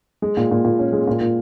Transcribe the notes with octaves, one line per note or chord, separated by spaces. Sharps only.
G#3
A#2
A#2
A#2
C#4
G#3
A#2
A#2